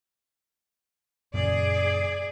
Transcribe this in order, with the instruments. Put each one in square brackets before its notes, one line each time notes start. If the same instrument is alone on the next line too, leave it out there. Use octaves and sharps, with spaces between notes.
[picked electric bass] F#2 A#2 C#3 [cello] G#4 D5